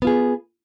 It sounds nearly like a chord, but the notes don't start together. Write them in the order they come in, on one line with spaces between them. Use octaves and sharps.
B3 F4 G#4